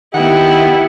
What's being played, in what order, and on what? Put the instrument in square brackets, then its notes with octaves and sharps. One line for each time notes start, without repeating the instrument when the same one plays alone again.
[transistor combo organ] D#3 [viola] B3 E4 [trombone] G4 [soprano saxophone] F#5